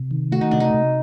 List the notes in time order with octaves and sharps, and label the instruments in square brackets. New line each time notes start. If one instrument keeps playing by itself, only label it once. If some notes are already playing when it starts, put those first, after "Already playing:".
Already playing: [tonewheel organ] C3
D#3
[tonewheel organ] A3 [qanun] F#4
[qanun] D#4
[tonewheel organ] C3 [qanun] D4
[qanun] D#4
[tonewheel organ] C3